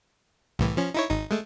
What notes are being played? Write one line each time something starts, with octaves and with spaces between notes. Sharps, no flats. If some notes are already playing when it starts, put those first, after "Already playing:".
C2 A2 E3
F3 C#4
D#4 E4 C#5
G#1 D#4
G#3 A3